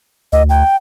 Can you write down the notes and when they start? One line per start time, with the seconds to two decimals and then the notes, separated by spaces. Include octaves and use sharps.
0.33 D2 D#5
0.50 G5